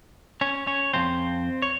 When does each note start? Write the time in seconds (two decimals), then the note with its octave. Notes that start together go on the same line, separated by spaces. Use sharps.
0.41 C#4 C#5
0.67 C#4 C#5
0.94 F2 C3 F3 C4 C5
1.62 C#5